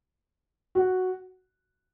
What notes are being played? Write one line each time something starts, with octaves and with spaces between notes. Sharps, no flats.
F#4